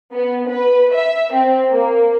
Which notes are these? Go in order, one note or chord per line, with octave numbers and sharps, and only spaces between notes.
B3
B4
E5
C4
A#3